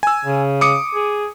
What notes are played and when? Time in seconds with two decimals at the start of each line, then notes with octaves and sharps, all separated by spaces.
0.03 G#5 E6
0.25 C#3
0.61 D6 D#6 C#7
0.95 G#4